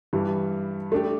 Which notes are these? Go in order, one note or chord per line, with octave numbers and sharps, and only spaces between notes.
G2 E3 G3
A3 D4 G4